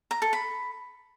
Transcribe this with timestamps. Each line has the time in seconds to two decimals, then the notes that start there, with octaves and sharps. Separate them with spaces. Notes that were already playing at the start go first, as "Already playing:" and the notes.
0.11 A#5
0.22 A4
0.33 B5